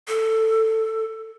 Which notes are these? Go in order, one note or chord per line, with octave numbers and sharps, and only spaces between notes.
A4